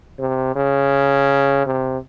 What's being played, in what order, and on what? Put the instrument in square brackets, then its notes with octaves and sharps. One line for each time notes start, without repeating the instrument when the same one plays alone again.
[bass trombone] C3
C#3
C3